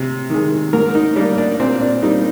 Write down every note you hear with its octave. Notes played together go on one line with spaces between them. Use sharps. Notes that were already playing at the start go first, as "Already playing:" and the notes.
Already playing: C3
D#3 G#3
G#2 A#4
D#4
G3 A#3 D4
D4
A#2 C4
D4
G3 A#3 D#4